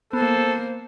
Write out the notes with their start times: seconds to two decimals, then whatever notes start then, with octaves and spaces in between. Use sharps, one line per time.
0.13 A#3 B3 A4 C5